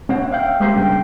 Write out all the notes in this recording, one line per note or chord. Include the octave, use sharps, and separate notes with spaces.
C4 C#5 F#5
E5 F5 G5
G#3 A#3 C4 G4 A#4 C5
G2 C#3 G5